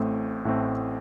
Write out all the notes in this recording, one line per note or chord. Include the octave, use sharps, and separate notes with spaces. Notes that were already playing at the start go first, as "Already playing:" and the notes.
Already playing: A1 A2 A3 C4
A1 A2 A3 C4